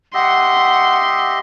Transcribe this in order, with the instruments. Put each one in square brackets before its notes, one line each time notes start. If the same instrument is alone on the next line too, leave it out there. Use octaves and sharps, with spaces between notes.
[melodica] G4 D#5 E5 [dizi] F#5 [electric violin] C6